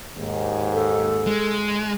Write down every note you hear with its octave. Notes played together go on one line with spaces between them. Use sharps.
D#2 G#2
A4
G#3